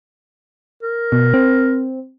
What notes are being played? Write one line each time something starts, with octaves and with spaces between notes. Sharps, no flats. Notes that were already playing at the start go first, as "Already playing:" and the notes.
A#4
B2
C4